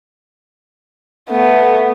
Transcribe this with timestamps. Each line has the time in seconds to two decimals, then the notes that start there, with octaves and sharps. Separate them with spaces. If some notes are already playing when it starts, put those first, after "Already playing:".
1.30 A3 B3